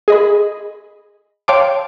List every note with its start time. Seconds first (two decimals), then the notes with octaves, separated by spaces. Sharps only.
0.08 G#4 D#5 B5
1.48 C#5 F5 G5 A5 C6 D6